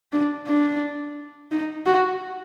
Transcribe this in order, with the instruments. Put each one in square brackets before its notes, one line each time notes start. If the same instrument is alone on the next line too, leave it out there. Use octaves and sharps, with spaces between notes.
[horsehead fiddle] D4
D4
D#4
F#4